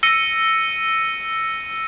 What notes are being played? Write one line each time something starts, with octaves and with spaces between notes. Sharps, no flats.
E6 A#6 C#7 D#7